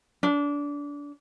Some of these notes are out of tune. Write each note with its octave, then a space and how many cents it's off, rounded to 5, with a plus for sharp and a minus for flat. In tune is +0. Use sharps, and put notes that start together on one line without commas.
D4 -25